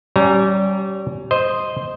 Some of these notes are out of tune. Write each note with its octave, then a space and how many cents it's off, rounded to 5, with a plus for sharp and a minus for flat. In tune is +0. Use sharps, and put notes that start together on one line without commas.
G3 -25 C#4 +0 A#5 +0
C5 +0 D#5 +0